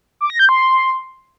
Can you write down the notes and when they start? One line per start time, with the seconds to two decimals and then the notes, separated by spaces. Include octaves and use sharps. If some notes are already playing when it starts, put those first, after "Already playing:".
0.21 D6
0.30 A#6
0.39 G6
0.49 C6